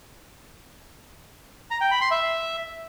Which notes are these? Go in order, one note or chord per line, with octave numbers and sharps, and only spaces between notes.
A#5
G5
B5
C6
E5